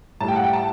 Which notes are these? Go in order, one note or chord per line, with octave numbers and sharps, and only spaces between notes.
A2 G3 A5
G5
F#5
G5
A5